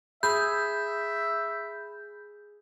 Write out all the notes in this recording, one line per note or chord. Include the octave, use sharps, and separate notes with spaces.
G#4 E5 B5 G6